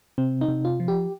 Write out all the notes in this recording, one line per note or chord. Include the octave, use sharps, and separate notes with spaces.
C3 C4
D#4
C3
F4
F3
G4